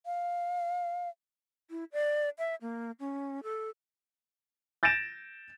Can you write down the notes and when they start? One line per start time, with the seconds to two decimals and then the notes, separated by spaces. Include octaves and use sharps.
0.06 F5
1.70 E4
1.93 D5
2.39 E5
2.62 A#3
3.00 C#4
3.43 A4
4.83 G6 A6 A#6 D7 E7